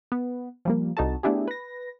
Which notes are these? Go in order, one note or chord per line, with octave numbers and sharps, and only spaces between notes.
B3
F3 G3 A#3
C2 D#4 F#4 A4 A5
A3 B3 D4 E4 G4 G#4
B4 A#6